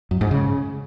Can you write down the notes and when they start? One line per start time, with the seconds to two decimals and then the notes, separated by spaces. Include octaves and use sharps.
0.11 F#2
0.21 G#2
0.31 C#3